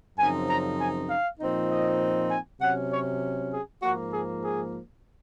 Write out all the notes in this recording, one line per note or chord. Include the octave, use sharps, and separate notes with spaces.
F#2 C#3 F3 C4 D#4 G#5
A#5
G#5
F5
A#2 F3 C4 D#4
D#5
G#5
C3 F#3 C#4 F#5
C#5
G#4
G#2 F3 A#3 F#4
G#4
G#4